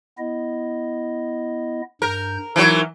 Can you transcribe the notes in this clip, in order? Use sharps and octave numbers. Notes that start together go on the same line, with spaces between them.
B3 E4 D#5
G2 A#4 G6
E3 F#3 D#4 A#4